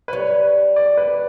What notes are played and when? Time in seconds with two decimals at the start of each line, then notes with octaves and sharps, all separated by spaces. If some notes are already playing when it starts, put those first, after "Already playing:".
0.08 B4
0.13 G3 C#5
0.76 D5
0.97 B4